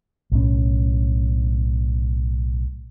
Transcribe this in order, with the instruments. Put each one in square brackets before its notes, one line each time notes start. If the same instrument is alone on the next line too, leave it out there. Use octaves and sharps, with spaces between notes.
[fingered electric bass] B1 A2 C#4